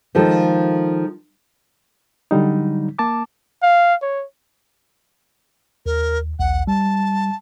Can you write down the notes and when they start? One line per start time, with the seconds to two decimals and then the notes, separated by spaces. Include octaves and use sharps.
0.15 D#3 F3 G#3 A4
2.31 D3 F#3 G3 D#4
2.99 A#3 A5 D6
3.62 F5
4.02 C#5
5.86 D#2 A#4
6.40 A#1 D#2 F#5
6.67 G3 A5